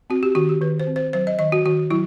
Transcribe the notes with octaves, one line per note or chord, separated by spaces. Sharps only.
C4 F#4
G4
D#3 F#4
G4
D#3 B4
C5
C4
C5
F#3 C5
D#5
D#3 D#5
F#4
D#3 F#4
F#3 E4